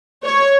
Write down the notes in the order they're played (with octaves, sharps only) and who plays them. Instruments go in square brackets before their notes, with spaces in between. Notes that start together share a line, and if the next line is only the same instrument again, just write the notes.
[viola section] C#5